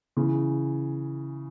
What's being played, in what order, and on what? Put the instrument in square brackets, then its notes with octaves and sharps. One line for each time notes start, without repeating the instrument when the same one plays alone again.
[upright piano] C#3 E3